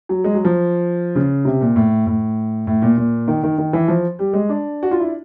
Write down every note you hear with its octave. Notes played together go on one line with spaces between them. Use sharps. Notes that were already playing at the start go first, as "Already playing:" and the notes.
F#3
G#3
F#3
F3
C#3
C3
A#2
A2
A2
A2
A#2
A#2
D#3
D#3
D#3
E3
F3
G3
G#3
D4
F#4
F4
E4